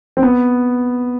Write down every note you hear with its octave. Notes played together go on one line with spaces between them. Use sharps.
C4
B3